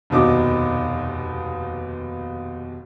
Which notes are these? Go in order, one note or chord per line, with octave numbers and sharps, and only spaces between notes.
F1 D#2 B2 D#4 D6